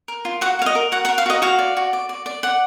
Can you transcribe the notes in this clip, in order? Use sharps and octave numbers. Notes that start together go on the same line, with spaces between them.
A#4
F4
F#4 F#5
F#4 F5
D#5
A#4
F#4 F#5
F#5
A#4
F5
F#4 D#5
F#4 F5
D5
F#4
D5
D5
D5
D5 F#5